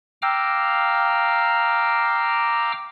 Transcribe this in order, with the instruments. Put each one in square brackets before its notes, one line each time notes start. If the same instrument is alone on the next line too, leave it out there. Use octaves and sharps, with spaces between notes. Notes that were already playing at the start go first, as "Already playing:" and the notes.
[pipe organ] F5 G5 A#5 D6 E6 F6